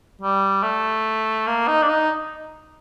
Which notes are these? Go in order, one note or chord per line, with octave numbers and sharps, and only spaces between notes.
G3
A3
A#3
D#4
D4
D#4